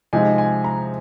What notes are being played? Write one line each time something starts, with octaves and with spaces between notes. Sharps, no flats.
C3 F3 G#3 D#4 G#5
G#5
A#5